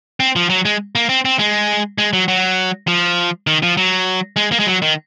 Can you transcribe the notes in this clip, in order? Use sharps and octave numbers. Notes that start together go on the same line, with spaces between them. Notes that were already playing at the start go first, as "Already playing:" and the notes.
C4
F3
F#3
G#3
A#3
C4
C4
G#3
G#3
F#3
F#3
F3
D#3
F3
F#3
G#3
A#3
G#3
F#3
D#3